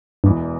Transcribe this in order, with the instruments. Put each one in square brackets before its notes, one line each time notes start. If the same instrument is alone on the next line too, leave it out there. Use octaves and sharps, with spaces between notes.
[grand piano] E1 E2 E3 [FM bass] G2